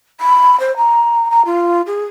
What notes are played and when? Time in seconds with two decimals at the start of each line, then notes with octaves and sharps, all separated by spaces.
0.20 B5
0.60 C5
0.77 A#5
1.30 A#5
1.45 F4
1.86 G#4